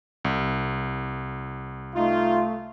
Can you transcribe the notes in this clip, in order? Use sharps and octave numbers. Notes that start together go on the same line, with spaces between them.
C2
A3 D#4 F4